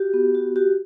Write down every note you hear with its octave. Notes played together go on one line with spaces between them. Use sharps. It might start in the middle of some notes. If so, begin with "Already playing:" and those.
Already playing: F#4 G4
B3
F#4
F#4 G4